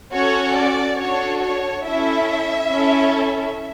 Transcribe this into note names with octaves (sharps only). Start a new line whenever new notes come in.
C#4 F#4 A4 C#5
D5
D4 F#4 A4 C#5
C#5
C#4 E4 A4 E5
C#4 E4 A4